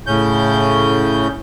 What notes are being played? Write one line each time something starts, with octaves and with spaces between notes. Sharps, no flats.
A2 C#3 C#4 G6